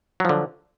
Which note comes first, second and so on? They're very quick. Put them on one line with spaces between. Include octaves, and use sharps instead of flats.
F#3 F3 D3